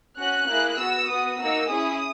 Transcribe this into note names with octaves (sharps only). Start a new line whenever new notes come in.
C#4 F#4 F#6
A#3 E4 G#4
B3 F#4 E6
B3 F#4 D#6
A#3 D#4 F#4 E6
C#4 E4 G#4 D#6